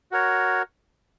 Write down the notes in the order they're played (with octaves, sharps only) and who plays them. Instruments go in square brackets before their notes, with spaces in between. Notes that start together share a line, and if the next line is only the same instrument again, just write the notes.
[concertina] F#4 A#4 C#5